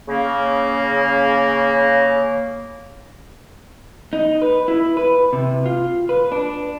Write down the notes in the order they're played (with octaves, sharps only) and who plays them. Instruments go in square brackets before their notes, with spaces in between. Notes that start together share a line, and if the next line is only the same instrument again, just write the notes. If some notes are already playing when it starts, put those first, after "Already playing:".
[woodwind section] C#3 A#3
[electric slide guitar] D#4
B4
E4
B4
C3
F4
B4
D4